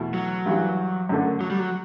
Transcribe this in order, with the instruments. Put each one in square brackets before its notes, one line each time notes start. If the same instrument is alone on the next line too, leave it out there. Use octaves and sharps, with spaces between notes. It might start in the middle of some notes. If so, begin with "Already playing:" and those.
Already playing: [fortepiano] E2 B2 A3 E4
[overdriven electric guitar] F#3
[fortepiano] G2 E3 G3
F#2 D3 A3
[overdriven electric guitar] F#3
G3
F#3